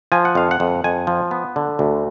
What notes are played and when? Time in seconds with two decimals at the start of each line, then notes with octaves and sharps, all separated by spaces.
0.12 F3 G#5
0.25 F#5
0.35 F2 F5
0.51 F#5
0.60 F2
0.84 F2 G#5
1.07 F3
1.31 B3
1.56 D3
1.79 D2